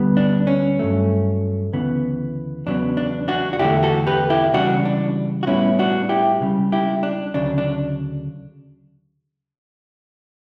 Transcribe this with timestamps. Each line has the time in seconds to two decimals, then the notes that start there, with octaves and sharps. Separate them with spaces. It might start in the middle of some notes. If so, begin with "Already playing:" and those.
Already playing: D2 D3 G3 B3
0.17 D4
0.47 C#4
0.79 G2 F#3 A3
1.73 D2 C#3 E3 B3
2.66 E2 C#3 F#3 B3 D4
2.97 D4
3.28 D4 F#4
3.53 F#4
3.59 E2 D3 A3 E4 G4
3.83 F#4 A4
4.07 G4 B4
4.30 E4 G4
4.53 C#2 C#3 E3 G3 D4 F#4
4.85 D4
5.43 F#4
5.47 A2 G3 B3 C#4 E4
5.79 D4 F#4
6.09 E4 G4
6.41 C#2 C#3 G3
6.72 E4 G4
7.03 D4
7.34 D2 C#3 F#3 D4
7.58 D4